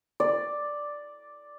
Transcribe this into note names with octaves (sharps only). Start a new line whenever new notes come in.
D5